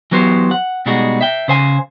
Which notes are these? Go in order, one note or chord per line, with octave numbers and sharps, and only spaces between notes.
E3 F#3 B3 G4 C5
F#5
B2 G3 G#3 D#4 F#4 G#4
E5 G5
C#3 C5 G#5